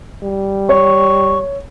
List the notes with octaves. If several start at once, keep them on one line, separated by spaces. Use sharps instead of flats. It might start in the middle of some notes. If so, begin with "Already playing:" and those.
G3
C#5 C#6